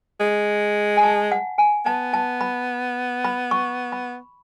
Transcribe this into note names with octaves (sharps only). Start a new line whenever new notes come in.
G#3
G#5
A5
F#5
G#5
B3 A5
A5
B5
B5
C#6
B5